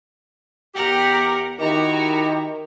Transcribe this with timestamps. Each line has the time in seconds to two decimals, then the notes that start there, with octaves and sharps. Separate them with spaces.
0.75 E2 G4 A#4 F#5
1.60 D#3 E4 F#4 G4 A#5